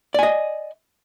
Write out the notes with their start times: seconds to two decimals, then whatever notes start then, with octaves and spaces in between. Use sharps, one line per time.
0.14 D5
0.19 G#5
0.23 D#5